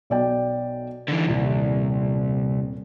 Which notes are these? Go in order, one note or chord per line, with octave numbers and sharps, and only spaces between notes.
B1 D5 G5
D3 E3
D#1 C2